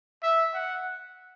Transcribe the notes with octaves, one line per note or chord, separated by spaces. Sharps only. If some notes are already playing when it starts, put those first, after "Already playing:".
E5
F#5